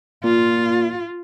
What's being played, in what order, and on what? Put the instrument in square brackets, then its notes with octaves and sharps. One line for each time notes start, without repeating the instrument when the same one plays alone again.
[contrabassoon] A#2 [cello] F4